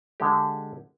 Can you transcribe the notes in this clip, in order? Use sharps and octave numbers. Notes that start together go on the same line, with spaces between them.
D3 G#3 G4